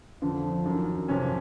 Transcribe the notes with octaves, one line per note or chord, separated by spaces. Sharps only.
F2 D3 F3
F#2 D#3
F2 C3 F3 C#4